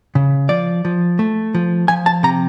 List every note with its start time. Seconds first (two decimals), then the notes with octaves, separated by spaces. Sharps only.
0.15 C#3
0.49 F3 D5
0.85 F3
1.19 A3
1.55 F3
1.88 F3 G#5
2.06 A5
2.23 C3 A#5